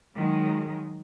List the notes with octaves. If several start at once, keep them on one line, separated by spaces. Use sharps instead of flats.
D#3 F#3 G#3